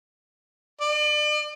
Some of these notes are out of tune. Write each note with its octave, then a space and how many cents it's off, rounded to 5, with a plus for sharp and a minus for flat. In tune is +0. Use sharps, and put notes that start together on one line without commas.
D5 +40